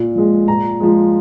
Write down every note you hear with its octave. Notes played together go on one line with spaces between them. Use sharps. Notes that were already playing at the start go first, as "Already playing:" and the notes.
Already playing: A#2
F3 G#3
A#2 A#5
F3 G#3